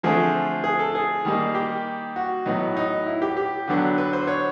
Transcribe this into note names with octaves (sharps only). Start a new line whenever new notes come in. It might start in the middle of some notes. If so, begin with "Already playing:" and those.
D3 F3 A3 C4 G#4
G#4
A4
G#4
D#3 G3 A#3 D#4
G4
F#4
A2 F#3 B3 D#4
D#4
E4
G4
G4
D3 F#3 B3 D4
B4
C5
C#5